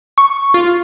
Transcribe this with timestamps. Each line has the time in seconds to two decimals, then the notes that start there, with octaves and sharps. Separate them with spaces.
0.18 C#6
0.54 F4